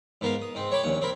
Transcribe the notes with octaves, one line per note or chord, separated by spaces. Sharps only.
G#2 B3 A#4 F5
D#6
G#2 C4
C#5 G5 B5 D6
A#1 D#2 C#4 F#5
C4 A#4 B5